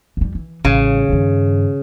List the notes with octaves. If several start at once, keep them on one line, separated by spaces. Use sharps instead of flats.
F2 G3
E3
A1 C#3 G3
G2 D#3